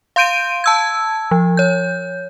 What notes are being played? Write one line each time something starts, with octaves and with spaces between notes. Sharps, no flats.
F5 C6 G6 D7 D#7
A5 E6 G#6
F3
C#5 G6